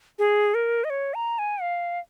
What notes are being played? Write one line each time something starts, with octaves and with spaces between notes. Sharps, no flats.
G#4
A#4
D#5
C#5
A#5
G#5
F5